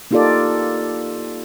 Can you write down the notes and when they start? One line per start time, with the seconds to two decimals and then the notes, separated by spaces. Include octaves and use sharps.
0.11 A#3 D#4 F4 G4 A4 D5